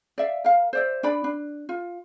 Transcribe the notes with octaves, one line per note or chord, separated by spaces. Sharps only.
D5 E5 F5
A#4 F5
C5 D5 E5
D4 D5 B5
D4
F4